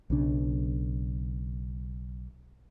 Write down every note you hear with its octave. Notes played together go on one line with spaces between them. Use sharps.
B1 C#3 D4